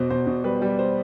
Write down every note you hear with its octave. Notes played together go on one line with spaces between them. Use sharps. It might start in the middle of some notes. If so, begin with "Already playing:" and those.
Already playing: E2 B2 C5
B2 C5
B2
G3 B4
G3
C5